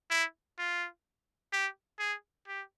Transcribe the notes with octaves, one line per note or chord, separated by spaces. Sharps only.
E4
F4
G4
G#4
G4